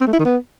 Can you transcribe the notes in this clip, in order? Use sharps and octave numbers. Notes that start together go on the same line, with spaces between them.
C4
A3
E4
D#3
B3